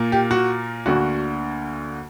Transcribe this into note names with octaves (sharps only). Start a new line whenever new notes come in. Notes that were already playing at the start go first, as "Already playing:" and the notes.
Already playing: A#2 A#3
G4
F#4
D2 D3 A#3 F#4